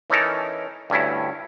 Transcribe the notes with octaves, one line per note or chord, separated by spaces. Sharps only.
E3 C#4 D#4 A4 A#4
D2 G2 C#4 E4